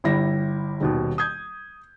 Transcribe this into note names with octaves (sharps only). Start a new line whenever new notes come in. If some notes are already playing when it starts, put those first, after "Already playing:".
G1 G3 E4 A#6
D#1 D#2 B2
D#6 G6 G#6